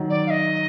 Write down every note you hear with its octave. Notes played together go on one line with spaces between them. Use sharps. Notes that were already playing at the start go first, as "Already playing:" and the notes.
Already playing: D#3 F#3
D5
F5
D#5